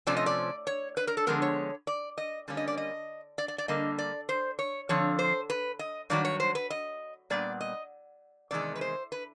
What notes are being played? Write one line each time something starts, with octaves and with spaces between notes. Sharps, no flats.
C3 F3 A3 C#4 D5
D#5
D5
C#5
B4
A#4
A4
D3 F3 G#3 B3 A#4
C#5
D5
D#5
D3 G3 A#3 C#4
D#5
D5
D#5
D5
D5
D5
D3 G3 A#3 D#5
D5
C5
C#5
F2 D3 F3 C#5
C5
B4
D#5
G2 D#3 F#3 D5
C#5
C5
B4
D#5
A#2 G3 B3 D5
D#5
E2 C3 D#3 G#3 D5
B4
C5
B4